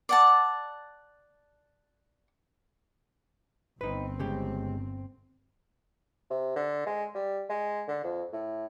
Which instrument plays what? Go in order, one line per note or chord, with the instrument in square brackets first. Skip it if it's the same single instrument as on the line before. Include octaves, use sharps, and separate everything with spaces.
[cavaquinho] D5 F#5 A5
[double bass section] G1 C4 [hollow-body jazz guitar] D#4 B4
[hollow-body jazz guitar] C#3 G#3 G4
[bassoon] C3
D3
G#3
G3
G#3
D3
F2
A2